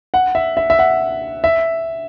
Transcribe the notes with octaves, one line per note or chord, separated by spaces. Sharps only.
F#5
E5
E5
E5
F#5
E5